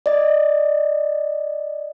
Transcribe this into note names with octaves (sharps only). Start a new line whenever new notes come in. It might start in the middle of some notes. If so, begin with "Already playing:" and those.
D5 D#5